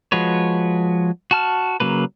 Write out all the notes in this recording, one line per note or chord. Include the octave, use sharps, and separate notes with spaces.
F3 G#3 F#4 B4 C#5
F#4 A5 F6
C#3 F#3 A#3 B4